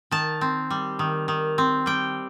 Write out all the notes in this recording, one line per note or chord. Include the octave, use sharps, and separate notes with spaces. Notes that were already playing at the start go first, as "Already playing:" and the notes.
D#3 A5
C4
G3
D#3
D#3
C4
G3 G5